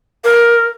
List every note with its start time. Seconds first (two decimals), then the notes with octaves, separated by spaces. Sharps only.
0.24 A#4